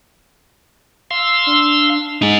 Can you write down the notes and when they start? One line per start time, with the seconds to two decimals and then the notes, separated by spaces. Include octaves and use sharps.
1.11 F5 C6 E6
1.47 D4
2.22 G#3 D#4 G#4